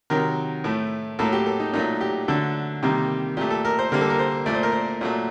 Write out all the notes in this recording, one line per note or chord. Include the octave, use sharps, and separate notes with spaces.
C3 D#3 F#3 A#4
A2 A3
A2 F#3 A#3 A4
G4
A4
D#4
A#2 F#3 A3 D#4
G4
D3 F#3 A3 A4
C3 D#3 G3 A#3
A#2 A3 G4
A4
A#4
C5
D3 G3 A#3 A#4
A4
A#4
C5
A#2 A3 D5
C5
A#4
C5
A#2 F#3 A3